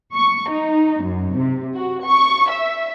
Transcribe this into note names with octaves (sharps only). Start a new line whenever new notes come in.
C#6
D#4
F#2
C3
F#4
C#6
E5